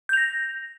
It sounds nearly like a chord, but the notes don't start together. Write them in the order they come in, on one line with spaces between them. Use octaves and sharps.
G6 F7 A#6